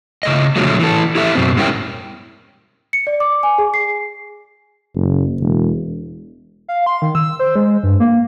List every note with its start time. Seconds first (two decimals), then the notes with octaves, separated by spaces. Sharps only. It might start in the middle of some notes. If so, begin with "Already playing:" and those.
0.23 C#3 A3 D#5
0.56 A#2 D3 F3 F#3 G#3 A3
0.79 E3 A4
1.15 E4 G4 A4 E5
1.35 F#2 B2 C4
1.56 G#2 G3 C#4 E4 A#4 G5
2.93 C#7
3.07 D5
3.20 D6
3.43 G#5
3.58 G#4
3.74 C7
4.95 F#1
5.41 E1
6.68 F5
6.86 C6
7.02 D#3
7.15 E6
7.40 C5
7.56 G#3
7.83 G2
8.00 A#3